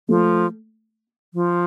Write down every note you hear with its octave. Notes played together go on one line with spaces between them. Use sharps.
F3 A3
F3